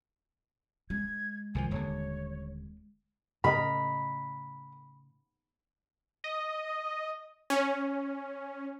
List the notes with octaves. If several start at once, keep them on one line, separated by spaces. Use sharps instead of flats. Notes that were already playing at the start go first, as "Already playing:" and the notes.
G#3 G#6
C2 D#3 F3 G#5
D#1 D3 C#5
A2 C#3 A#4 D#5 B5
D#5
C#4